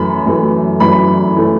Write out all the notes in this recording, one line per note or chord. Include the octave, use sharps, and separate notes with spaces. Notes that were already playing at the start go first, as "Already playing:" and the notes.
Already playing: F#2 E3 A3 B5
F#2 E3 A3
F#2 E3 A3 B5
E3 A3